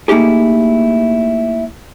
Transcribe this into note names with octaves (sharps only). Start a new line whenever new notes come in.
A3 A#3 D#4 E4 G4 G#4